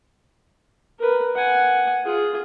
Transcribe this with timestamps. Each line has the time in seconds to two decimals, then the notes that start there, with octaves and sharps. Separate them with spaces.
0.99 A#4 B4
1.36 F#5 G#5
2.04 F4 G#4